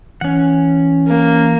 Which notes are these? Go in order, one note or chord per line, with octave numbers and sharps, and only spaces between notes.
E3 C#4 F#5
A#3